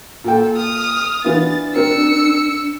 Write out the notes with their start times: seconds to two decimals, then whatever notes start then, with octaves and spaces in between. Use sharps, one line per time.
0.24 A#2 A4 G5
0.57 D#6 F6
1.24 E3 B3 D4 F4 A6
1.75 C4 A#4 E6 C#7